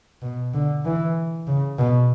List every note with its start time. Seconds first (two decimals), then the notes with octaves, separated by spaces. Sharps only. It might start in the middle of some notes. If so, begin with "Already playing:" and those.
0.22 B2
0.54 D3
0.85 E3
1.47 C#3
1.78 B2